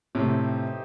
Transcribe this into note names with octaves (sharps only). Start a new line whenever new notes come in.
A2 C3 E3 A3 D#4 G4 C5